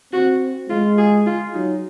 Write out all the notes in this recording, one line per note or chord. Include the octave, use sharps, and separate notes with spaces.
C4 F#4
G#3 F4
G#4
F4
F#3 D#4